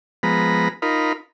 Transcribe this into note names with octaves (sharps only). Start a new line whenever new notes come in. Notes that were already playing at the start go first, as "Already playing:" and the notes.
F3 G#3 B3 A#5 B5
D#4 F4 A#4 B5